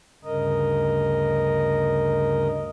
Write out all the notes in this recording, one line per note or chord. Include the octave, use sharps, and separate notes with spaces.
D2 G2 C#3 A#4 D#5